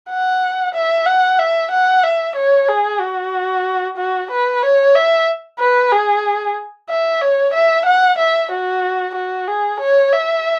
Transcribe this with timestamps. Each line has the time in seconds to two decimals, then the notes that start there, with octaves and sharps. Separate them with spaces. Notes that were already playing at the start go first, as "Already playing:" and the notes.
0.10 F#5
0.75 E5
1.06 F#5
1.39 E5
1.72 F#5
2.04 E5
2.36 C#5
2.68 G#4
3.01 F#4
3.97 F#4
4.31 B4
4.63 C#5
4.95 E5
5.59 B4
5.92 G#4
6.90 E5
7.21 C#5
7.54 E5
7.86 F#5
8.19 E5
8.51 F#4
9.15 F#4
9.48 G#4
9.80 C#5
10.12 E5